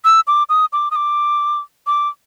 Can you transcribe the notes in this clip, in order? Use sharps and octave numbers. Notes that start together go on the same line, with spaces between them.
E6
D6
D#6
D6
D#6
D6
D6